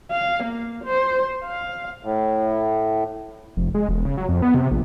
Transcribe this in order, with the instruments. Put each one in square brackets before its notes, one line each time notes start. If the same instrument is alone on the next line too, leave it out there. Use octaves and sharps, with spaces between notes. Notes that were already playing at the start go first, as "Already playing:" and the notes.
[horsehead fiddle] F5
A#3
C5
F5
[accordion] A2
[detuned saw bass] F1
G#3
E1
C#3
F#3
F2
B3
C3
A#1